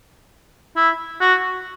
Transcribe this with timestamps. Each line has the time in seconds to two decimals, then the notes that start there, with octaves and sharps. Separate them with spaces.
0.76 E4
1.21 F#4